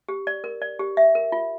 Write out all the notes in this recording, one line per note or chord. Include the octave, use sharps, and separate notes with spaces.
G4
D5
A#4
D5
G4
E5
A#4
F4